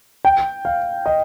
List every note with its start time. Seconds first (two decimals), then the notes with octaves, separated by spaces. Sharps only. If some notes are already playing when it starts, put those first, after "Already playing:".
0.25 G5
0.65 F5
1.06 D#5